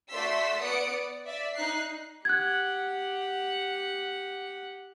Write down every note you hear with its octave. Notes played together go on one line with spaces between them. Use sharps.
A3 F#4 D5 C6 E6 B6
B3 D5 D#6 C#7 D7
D5
D5 E5
D#4 F#6 C7
G4 F#5 F#6 G#6